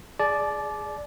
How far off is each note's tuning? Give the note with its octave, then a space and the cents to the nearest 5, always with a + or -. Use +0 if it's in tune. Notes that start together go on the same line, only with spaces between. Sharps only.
G#4 +0 D5 +0 A5 -45